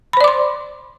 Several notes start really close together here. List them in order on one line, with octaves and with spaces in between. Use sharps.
B5 C5 D5 D6 C6